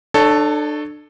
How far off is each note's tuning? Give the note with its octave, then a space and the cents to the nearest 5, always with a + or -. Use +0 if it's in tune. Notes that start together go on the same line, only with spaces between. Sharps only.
D4 +35 A4 +0 C#5 +0